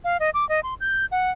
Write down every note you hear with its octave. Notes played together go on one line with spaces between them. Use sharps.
F5
D#5
D6
D#5
C6
G6
F#5